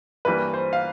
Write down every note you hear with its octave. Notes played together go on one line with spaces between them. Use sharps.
G2 E3 G3 A#3 B4
C5
F5